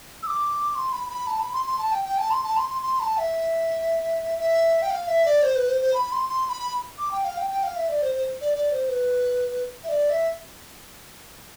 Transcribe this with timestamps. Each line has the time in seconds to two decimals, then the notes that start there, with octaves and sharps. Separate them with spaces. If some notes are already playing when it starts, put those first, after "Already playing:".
0.23 E6
0.27 D6
0.75 C6
0.92 B5
1.09 B5
1.27 A5
1.39 B5
1.53 C6
1.66 C6
1.79 A5
1.92 G5
2.05 G5
2.18 A5
2.31 C6
2.43 A5
2.57 C6
2.70 C6
2.82 C6
3.00 A5
3.18 E5
4.39 E5
4.82 G5
4.90 F5
5.08 E5
5.25 D5
5.42 C5
5.56 B4
5.69 C5
5.81 C5
5.94 B5
6.12 C6
6.29 C6
6.46 C6
6.49 B5
6.98 D6
7.11 G5
7.24 F5
7.37 G5
7.50 G5
7.63 F5
7.76 E5
7.89 D5
8.02 C5
8.15 C5
8.41 D5
8.54 D5
8.71 C5
8.89 B4
9.84 E5
9.89 D5
10.10 E5